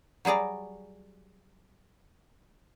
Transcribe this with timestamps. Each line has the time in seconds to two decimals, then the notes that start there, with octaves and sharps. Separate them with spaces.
0.25 F#3 G3 G#4 D5 A#5